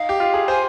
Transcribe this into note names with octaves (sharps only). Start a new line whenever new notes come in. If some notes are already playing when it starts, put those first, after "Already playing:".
Already playing: D#4 F5
G4
F4
G#4
C5 G#5